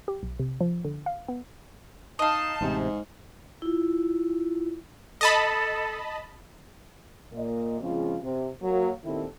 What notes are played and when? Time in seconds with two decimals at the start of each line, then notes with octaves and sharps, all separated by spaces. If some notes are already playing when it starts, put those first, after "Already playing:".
0.08 G4
0.23 B1
0.39 C3
0.61 F3
0.85 D3
1.06 F5
1.28 B3
2.19 D#4 D#5 F5 A5
2.61 A1 G#2 C3
3.62 E4 F4
5.21 A4 D#5 A5 B5
7.33 A#2 A#3 D#5
7.80 C#3 F3 G#3 C4 F4
8.22 C3
8.62 F#3 A#3
9.05 A#2 D#3 C4 E4 G4 A4